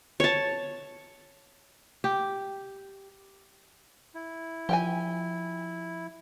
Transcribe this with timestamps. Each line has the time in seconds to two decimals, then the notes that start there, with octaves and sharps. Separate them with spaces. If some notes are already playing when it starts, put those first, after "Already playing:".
0.20 C#5 A5
2.04 G4
4.15 E4
4.69 F3 G4 G5 G#5